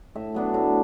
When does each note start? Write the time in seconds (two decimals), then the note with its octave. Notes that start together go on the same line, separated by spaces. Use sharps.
0.15 A2 E5
0.34 F#3 B3 D4
0.54 A2